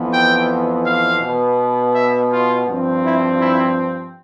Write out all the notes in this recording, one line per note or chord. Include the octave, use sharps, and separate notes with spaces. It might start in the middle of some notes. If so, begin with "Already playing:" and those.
Already playing: F2 E3 B3
G5
F5
B2 B3
E5
F4
G2 F3 C4
E4
E4